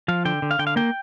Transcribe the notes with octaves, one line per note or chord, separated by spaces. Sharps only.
F3 F5
D3 G5
D3
F5
D3 G5
F5
A#3 G5